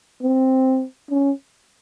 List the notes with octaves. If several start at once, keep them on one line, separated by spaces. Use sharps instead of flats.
C4
C#4